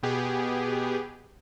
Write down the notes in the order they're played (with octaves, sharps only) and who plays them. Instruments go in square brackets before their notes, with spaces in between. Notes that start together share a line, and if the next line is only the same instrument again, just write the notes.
[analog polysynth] B2 B3 G4 G#4